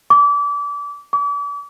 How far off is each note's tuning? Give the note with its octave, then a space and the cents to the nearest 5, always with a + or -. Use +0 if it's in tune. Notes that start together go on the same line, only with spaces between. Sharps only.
D6 -30
D6 -40